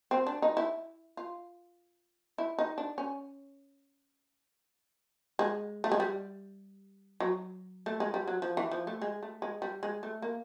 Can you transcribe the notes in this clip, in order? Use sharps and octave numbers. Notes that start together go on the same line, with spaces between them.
C4
D4
D#4
E4
F4
E4
D#4
D4
C#4
G#3
A3
G#3
G3
F#3
A3
G#3
G3
F#3
F3
E3
F3
A3
G#3
A3
G#3
G3
G#3
A3
A#3